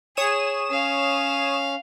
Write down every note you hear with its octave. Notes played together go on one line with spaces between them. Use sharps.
G#4 C#5 D#6 E7
C#4 F5